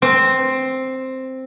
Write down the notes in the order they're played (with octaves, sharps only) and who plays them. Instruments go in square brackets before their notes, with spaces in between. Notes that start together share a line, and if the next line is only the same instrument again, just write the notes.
[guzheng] C4